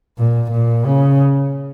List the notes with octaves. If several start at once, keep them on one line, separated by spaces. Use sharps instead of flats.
A#2
A#2
C#3